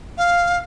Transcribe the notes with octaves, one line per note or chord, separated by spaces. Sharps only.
F5